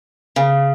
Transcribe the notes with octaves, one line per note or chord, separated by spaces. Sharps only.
C#3